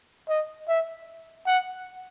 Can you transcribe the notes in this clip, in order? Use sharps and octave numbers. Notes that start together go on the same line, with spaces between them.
D#5
E5
F#5